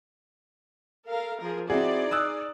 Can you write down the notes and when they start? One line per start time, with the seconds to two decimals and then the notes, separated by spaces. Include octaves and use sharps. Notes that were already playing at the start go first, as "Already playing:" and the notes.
1.07 A4 A#4 F5
1.40 F3 G#4 A#4
1.70 C4 D#4 E4 F#4 G#4 D5
2.11 D#6 E6 F#6